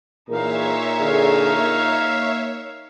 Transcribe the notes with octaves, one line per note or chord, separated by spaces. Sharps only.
A#2 E3 D#4 G#4 A#4 C#5 E5 F5
D3 G#4
A#3